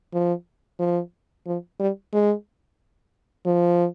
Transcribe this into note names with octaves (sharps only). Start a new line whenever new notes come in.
F3
F3
F3
G3
G#3
F3